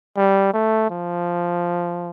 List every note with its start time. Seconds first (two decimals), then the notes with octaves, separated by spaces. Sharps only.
0.17 G3
0.53 A3
0.90 F3